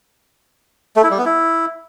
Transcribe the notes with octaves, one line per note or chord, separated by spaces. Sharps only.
A3
E4
G3
B3
E4